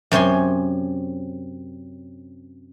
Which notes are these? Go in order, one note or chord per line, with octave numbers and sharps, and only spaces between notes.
F#2 C3 C#5 G#5 C6